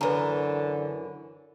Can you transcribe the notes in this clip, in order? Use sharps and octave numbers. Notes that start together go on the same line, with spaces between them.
F#2 D3 E3 B4 A#5